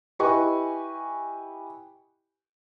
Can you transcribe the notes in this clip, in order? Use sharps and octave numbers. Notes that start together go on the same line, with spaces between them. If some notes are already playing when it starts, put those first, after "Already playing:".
E4 G4 B4 D#5 G#5 C#6